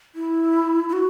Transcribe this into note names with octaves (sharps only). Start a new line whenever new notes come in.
E4
E4
F#4